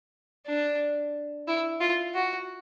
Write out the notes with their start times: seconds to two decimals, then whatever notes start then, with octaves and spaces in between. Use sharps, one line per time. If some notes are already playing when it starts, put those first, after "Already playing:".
0.47 D4
1.48 E4
1.80 F4
2.14 F#4